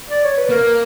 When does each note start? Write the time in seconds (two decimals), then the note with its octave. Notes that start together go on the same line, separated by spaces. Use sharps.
0.10 D5
0.23 C#5
0.37 B4
0.50 A#3 A#4